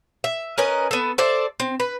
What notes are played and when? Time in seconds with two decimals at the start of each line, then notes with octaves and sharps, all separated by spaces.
0.24 E5
0.58 C#4 A#4 B4 D#5
0.91 B3 A4
1.18 A4 C5 D5 E5
1.60 C4
1.80 B4